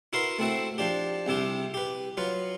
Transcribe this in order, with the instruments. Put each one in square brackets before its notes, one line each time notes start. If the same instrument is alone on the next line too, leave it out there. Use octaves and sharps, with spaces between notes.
[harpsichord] E4 F#4 A#4 B4 C6
A3 C4 E4 F#4
F3 D4 G4
C2 C3 E4 G4
G4 B4
F#3 F4 B4